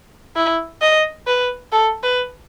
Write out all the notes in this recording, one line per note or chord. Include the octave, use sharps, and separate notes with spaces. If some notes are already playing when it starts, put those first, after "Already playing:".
E4
D#5
B4
A4
B4